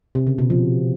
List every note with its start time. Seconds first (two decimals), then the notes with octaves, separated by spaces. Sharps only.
0.15 C3
0.27 C#3
0.38 B2
0.50 F3